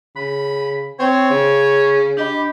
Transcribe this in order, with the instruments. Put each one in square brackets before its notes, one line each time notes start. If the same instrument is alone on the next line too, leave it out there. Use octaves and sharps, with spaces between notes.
[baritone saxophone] C#3 [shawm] B5
[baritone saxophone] C4 [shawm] C#5
[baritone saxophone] C#3
[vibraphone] D4 D#5 B5 [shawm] G4